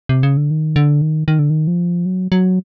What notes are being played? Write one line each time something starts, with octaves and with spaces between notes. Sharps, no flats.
C3
C#3
D3
D#3
D3
D#3
D#3
D3
D#3
F3
F#3
F#3